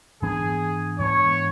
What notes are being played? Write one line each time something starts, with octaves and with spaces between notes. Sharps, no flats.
G#2 E3 B3 D4 G#4
G#2 E3 B3 D4 C#5